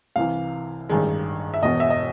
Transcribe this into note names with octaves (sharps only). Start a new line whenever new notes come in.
C2 C3 E3 F5
A1 G2 D#3 G#3
E5
E1 E2 B2 D#5
E5
D#5